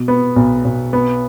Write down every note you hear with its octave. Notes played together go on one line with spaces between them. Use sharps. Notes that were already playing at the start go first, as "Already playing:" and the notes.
Already playing: B2
B3
B1
B1
B3